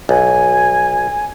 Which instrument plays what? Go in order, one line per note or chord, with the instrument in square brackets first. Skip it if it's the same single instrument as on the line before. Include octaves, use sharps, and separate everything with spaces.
[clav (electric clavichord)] B1 [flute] G#5